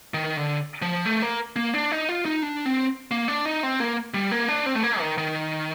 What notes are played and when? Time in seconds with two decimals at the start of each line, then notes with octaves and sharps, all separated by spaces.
0.14 D#3
0.37 D3
0.82 F3
1.06 A3
1.22 A#3
1.56 A#3
1.74 D4
1.92 D#4
2.09 F4
2.25 D#4
2.43 D4
2.65 C4
3.11 A#3
3.28 D4
3.46 D#4
3.63 C4
3.80 A#3
4.14 G3
4.31 A#3
4.49 D4
4.66 C4
4.75 A3
4.83 A#3
5.00 D#3
5.18 D#3